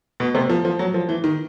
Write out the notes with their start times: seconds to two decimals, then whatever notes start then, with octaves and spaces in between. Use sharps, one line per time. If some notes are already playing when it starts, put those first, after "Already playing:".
0.20 B2
0.35 C3
0.49 F3
0.65 F3
0.79 F#3
0.94 F3
1.09 E3
1.24 D#3